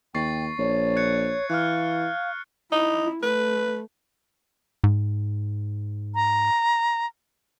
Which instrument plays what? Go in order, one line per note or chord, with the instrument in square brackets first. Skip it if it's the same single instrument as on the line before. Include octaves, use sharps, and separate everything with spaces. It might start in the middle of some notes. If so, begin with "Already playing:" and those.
[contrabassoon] D#2 [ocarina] G5 [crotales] C#6 A6 C7
[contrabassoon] A#1 [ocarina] C#5
[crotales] F#6 G#6 C#7
[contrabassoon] E3 [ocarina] F5 [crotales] F6 F#6
[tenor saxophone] D#4 [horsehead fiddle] E4
[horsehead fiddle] A3 [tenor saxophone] B4
[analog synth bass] G#2
[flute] A#5